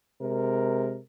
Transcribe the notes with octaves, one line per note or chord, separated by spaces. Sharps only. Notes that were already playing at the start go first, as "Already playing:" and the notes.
C3 G#3 A#4